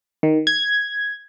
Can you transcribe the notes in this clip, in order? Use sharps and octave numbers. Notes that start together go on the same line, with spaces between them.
D#3
G#6